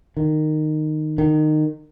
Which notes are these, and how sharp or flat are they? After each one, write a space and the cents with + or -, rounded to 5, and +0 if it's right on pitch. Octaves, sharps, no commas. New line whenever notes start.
D#3 -15
D#3 -20